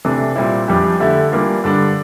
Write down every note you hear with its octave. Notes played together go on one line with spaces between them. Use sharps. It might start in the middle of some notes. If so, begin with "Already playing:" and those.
C3 E3 A3 D4
A#2 G3 C4 E4
F2 E3 G3 D4 G4
D3 A3 E4 G4
E3 G3 A#3 D4 F4
G2 D3 G3 D4